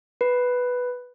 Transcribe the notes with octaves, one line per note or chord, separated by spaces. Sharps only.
B4